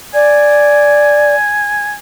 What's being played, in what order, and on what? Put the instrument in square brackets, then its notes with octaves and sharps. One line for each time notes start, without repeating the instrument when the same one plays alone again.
[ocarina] D5 [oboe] G#5